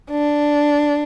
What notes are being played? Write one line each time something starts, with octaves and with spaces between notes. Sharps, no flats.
D4